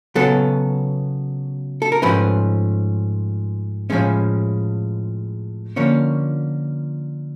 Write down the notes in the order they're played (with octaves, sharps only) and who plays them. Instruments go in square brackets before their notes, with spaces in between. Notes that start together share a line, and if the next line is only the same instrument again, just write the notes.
[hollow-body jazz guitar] C#3 F#3 B3 A4
A4
A#4
G#2 F3 A3 C#4 B4
A2 F3 G#3 C#4
D3 F3 A#3 C#4 C#5